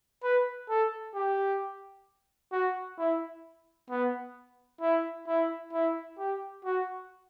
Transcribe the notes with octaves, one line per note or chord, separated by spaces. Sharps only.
B4
A4
G4
F#4
E4
B3
E4
E4
E4
G4
F#4